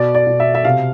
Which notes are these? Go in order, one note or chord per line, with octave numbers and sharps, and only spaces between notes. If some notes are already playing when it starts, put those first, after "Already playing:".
Already playing: B2 D5
D5
B2
E5
E5
C3 F5